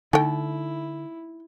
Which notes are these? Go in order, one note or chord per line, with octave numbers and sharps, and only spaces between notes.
D3 A3 D#4 E4 G5